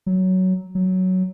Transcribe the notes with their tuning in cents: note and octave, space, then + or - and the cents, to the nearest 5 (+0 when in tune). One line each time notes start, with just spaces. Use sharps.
F#3 +10
F#3 +5